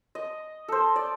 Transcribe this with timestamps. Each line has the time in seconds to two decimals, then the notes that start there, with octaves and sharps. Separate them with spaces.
0.15 D#5
0.68 A4 C5
0.96 D5